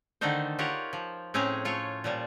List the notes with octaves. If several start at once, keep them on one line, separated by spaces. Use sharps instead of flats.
D3 D#3 A3 D4 D#4 C5
F4 G4 A#4 C#5 F#5
F3
A2 C4 C#4 G#4 A#5
A3 F4 C#5
A#2 F3 G3